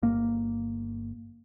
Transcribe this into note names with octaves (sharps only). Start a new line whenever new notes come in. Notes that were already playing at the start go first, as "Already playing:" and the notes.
G1 A#3